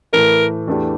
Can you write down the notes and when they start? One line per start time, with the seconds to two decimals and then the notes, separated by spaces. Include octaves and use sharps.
0.13 A2 E3 A3 A#4
0.67 E2 E3 A3 D4 G4